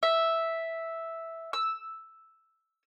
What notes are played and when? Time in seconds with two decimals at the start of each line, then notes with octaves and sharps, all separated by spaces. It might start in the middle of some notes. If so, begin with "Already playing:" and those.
0.03 E5
1.53 E6